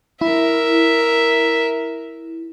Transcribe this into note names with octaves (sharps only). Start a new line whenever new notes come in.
E4 A#4 E5